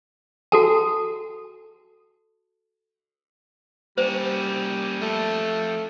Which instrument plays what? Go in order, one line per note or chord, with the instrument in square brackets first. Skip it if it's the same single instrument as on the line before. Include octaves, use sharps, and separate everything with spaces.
[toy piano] F#4 A4 A5
[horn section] G3 [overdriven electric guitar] A#3 C#4 [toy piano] C5
[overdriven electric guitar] F3 A4 [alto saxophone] A3